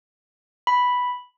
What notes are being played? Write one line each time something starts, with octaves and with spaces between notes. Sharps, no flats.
B5